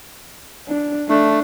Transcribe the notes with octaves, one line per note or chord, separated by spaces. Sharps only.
D4
A3 D4